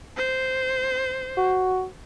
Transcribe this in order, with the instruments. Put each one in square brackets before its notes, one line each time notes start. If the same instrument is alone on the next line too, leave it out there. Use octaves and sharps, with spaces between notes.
[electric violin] C5
[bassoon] F#4